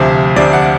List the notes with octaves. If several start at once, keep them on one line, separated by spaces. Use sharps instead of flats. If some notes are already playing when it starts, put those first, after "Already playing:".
Already playing: D2 C3 F3
D2 C3 F3 D5
F#5